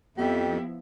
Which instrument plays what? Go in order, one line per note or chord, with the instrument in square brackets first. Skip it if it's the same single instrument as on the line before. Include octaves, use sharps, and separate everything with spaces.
[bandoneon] F2 [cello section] F3 B3 E4 [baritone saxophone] G4